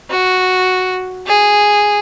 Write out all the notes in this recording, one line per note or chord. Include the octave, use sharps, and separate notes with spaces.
F#4
G#4